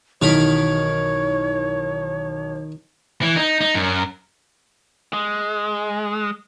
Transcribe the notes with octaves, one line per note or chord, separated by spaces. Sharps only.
B1 D#3 E3 A#4 C#5 B5
E3
D#4
D#4
F#2
G#3